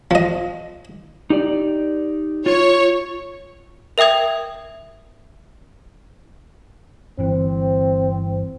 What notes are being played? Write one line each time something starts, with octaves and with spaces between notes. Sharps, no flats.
F3 D#5
D#4 G4 D5
F4 C#5
A#4 E5 G5 D#6 G#6
G1 E3 C4